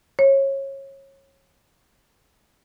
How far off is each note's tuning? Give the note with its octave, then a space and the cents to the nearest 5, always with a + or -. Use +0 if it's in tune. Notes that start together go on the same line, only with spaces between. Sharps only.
C#5 -25